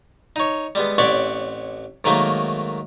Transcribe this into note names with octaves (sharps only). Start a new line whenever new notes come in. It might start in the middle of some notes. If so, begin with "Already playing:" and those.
D#4 C#5
G3 G#3 B3
A1 C4 C#5 D5 E5 F#5
G#2 D#3 F#3 A3 A#3